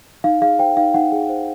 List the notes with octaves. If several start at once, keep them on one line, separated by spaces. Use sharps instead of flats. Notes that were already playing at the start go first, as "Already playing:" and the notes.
D#4 F5
G#4 F5
C5 G5
D#4 F5
D#4 F#5
G#4
C5